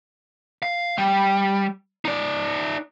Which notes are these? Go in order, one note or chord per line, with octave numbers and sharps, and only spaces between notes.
F5
G3
D#4 D5